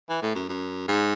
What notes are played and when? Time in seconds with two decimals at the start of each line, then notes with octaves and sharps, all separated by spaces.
0.09 E3
0.22 A2
0.35 F#2
0.49 F#2
0.88 G#2